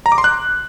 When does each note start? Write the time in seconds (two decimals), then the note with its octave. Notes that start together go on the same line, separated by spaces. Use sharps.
0.06 A#5
0.12 D6
0.18 C6
0.24 F#6